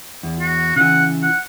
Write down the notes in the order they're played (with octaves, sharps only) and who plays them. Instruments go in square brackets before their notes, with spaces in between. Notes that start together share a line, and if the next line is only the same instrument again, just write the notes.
[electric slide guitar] E2
[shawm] F#4
[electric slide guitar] C#3 E3 [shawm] F#5
[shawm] F#5